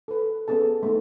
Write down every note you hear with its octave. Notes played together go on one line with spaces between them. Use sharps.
A4 B4
B3 C#4 G#4 A4 A5
A3 B3 D#4